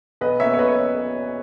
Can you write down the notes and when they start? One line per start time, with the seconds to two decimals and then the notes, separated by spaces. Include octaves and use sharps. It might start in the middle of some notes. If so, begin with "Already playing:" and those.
0.21 B1 B4 D#5
0.40 B2 A#3 C#4 C#5 E5
0.54 C#5
0.59 B1 B4 D#5
0.68 C#5 E5